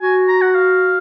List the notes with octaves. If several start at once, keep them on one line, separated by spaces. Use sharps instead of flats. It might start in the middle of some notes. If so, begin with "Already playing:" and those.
F#4 G#5
A#5
F#5
F5